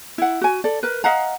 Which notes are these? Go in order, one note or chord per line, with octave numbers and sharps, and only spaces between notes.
E4 F#5
F#4 G#5
A4 D5
A#4 B4
D#5 F5 F#5 A#5